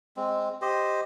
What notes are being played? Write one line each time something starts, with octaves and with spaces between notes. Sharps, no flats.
G#3 C4
G4 C5 D#5